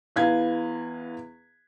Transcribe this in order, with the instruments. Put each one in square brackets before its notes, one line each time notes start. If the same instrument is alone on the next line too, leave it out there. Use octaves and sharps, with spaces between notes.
[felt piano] E2 B4 F5 G#6